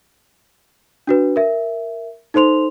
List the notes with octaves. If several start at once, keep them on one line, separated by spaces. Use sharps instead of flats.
D4 F#4 B4
A#4 E5
D#4 A4 C5 C6 F7